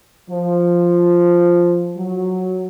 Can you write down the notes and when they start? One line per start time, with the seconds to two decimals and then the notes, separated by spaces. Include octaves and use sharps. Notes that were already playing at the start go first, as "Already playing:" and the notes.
0.30 F3
1.97 F#3